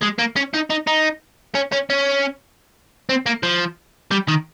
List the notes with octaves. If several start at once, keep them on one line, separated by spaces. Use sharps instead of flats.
G#3
A#3
C#4
D#4
D#4
D#4
C#4
C#4
C#4
C4
A#3
F3
G3
D#3